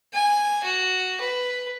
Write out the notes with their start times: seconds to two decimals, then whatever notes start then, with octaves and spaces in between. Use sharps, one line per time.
0.13 G#5
0.64 F#4
1.20 B4